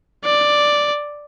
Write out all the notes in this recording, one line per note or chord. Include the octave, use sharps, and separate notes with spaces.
D5